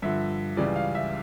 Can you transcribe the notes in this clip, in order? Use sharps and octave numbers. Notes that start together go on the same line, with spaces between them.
G2 D3 F3 E5
C#2 C#3 E3 G3 D5
F5
E5